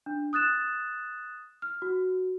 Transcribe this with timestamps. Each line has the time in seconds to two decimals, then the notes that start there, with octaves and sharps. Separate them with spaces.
0.06 D4
0.33 D#6 F#6 A6 E7
1.62 F6
1.82 F#4